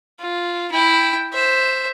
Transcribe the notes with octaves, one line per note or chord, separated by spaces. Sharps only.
F4
E4 G5
C5 E5